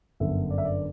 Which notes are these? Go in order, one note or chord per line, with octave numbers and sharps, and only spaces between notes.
G1 F#2 D3 E5
D5
E5
D5